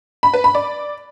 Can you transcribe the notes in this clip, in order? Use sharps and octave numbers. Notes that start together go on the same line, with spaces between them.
B5
B4
B5
D5